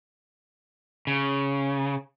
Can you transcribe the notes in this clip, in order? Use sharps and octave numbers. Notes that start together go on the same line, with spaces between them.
C#3